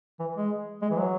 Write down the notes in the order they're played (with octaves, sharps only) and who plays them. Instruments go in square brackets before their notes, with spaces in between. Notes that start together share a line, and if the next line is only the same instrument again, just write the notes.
[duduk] E3
G#3
G#3
E3
F#3